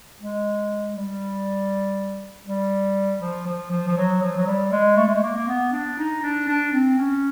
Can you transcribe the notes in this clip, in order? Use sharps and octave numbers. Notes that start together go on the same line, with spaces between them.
G#3
G3
G3
F3
F3
F3
F3
F#3
F3
F#3
G3
G#3
A3
G#3
A3
A#3
A#3
B3
D4
D#4
D4
D4
C4
C#4